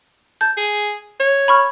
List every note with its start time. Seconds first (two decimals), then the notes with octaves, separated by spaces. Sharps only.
0.41 A5 G6
0.57 G#4
1.20 C#5
1.48 B5 C#6 F6